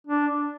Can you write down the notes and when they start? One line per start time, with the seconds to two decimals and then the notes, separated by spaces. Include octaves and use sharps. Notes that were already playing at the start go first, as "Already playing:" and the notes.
0.07 D4